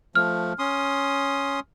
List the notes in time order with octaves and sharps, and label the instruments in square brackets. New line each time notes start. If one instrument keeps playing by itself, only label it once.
[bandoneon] F3 A3 [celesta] F6
[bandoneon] C#4 C6 D#6